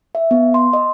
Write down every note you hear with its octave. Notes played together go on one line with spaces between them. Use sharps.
E5
B3
C6
D#5